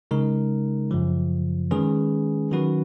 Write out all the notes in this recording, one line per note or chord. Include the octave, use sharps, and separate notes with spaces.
C#3 G#3 D#4 A#4
F#2 C#3 F3
D#3 G#3 C#4 G#4 B4
D#3 F#3 C#4 F#4 B4